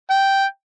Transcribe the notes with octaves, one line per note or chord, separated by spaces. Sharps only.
G5